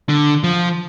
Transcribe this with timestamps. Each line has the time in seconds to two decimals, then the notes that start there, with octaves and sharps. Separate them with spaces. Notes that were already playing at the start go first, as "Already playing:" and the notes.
0.09 D3
0.44 F3